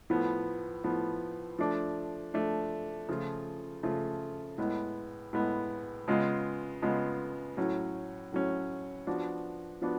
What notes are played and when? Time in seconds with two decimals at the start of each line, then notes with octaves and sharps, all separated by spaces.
0.10 A2 F3 B3
0.84 A2 F3 B3
1.59 F3 A3 D4
2.34 F3 A3 D4
3.09 C#3 F3 A3 F4
3.83 C#3 F3 A3 F4
4.58 A2 G#3 B3
5.33 A2 G#3 B3
6.08 C#3 G#3 B3 F4
6.82 C#3 G#3 B3 F4
7.57 A2 F#3 C#4
8.32 A2 F#3 C#4
9.07 F3 B3 D4 F#4
9.82 F3 B3 D4 F#4